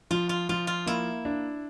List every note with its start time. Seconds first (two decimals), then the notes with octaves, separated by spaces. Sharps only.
0.11 F3 F4
0.29 F4
0.49 F3 F4
0.67 F4
0.86 A#3 E4
1.25 D4